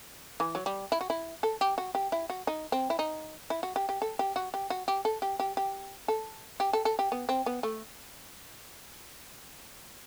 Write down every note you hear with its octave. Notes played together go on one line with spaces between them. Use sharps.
E3
F#3
G3
E4
F#4
E4
A4
G4
F#4
G4
E4
F#4
D#4
C4
E4
D#4
E4
F#4
G4
G4
A4
G4
F#4
G4
F#4
G4
A4
G4
G4
G4
A4
G4
A4
A4
G4
B3
C4
B3
A3